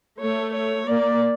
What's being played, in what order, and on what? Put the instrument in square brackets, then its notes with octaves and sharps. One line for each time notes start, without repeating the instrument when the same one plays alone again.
[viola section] A3 [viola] C#5
[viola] C#5
[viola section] A#3 [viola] D5